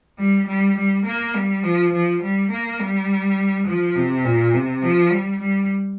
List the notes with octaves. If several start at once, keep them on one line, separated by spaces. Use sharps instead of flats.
G3
G3
G3
A#3
G3
F3
F3
G3
A#3
G3
F3
C3
A#2
C3
F3
G3
G3